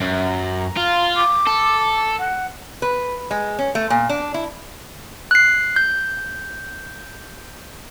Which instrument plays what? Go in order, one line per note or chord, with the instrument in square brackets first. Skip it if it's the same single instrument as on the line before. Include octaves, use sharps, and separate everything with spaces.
[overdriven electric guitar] F#2
[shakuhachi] A#5
[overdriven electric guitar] F4
[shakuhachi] D6
[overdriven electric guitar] A4
[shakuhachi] F#5
[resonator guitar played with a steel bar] B4
G#3
C#4
A3
A#2
D4
E4
[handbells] F#6 C7
G6